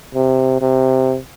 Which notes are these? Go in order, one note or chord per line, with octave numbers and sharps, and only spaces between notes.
C3
C3